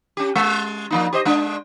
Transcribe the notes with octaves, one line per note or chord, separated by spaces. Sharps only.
C#4 G4
G#3
F3 A#3 D#4
G4 C5 D#5
G#3 D4